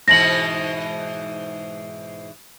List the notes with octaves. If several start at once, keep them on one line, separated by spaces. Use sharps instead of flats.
G#2 B2 E3 A#6 F#7